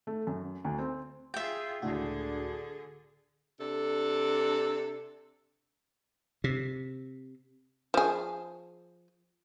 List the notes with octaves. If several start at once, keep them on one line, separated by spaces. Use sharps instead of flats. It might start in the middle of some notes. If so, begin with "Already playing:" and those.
A3
F#2
D2
C4
F4 G#4 E5 G5
C#2 A2 D3 D4 F#4 G#4
C3 D4 A4
C3
F3 G#4